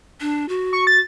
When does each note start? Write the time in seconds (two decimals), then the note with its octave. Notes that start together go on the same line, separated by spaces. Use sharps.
0.21 D4
0.49 F#4
0.73 C#6
0.87 A6